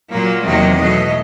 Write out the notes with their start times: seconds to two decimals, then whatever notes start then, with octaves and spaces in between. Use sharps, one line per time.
0.12 A#2 F#3 A#3
0.45 E2 C3 D#3 F#3 A#3 D#5
0.78 B2 F#3 A3 D#5